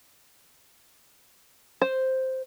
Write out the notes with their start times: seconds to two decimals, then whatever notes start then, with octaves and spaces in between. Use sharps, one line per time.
1.82 C5